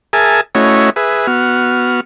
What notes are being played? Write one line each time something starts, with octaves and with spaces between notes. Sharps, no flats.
G#4 A#4 E5 G#5 A5
A3 C#4 E4 F#4 C#5 D#5
G#4 B4 E5
B3 F#4 F6